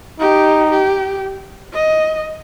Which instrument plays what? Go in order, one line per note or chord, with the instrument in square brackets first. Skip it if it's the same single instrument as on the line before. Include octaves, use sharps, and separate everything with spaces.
[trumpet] D#4 [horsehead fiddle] G4
[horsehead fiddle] G4
D#5